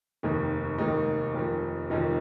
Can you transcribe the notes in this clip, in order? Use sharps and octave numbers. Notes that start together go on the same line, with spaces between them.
F1 D#2 D#3 D#4
F1 D#2 D#3 D#4
F1 F2 D#3
F1 F2 D#3 D#4